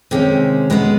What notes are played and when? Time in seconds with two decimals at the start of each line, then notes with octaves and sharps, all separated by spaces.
0.11 C3 D#3 G#3 C#4
0.70 B2 G#3 B3